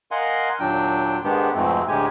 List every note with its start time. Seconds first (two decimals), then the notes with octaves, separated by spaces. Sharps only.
0.11 A#4 D#5 F5 F#5 G#5 C6
0.60 D#2 A#2 F#3 D4 G5
1.24 G#2 D#3 G#3 B3 D4 G4
1.54 F2 G#2 B2 G#3 A3 C4
1.88 D2 A2 G#3 G4 G#5